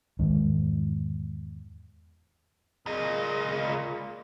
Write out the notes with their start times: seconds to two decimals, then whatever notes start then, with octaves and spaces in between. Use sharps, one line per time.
0.19 E2 G#2 D#3
2.86 C#2 A#2 G#4 D#5